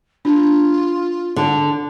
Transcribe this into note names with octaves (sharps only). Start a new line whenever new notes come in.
D4 F4
D3